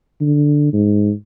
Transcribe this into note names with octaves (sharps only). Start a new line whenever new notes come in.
D3
G#2